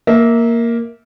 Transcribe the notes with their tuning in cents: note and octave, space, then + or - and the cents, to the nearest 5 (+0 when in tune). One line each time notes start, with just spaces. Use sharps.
A#3 +0 E5 -20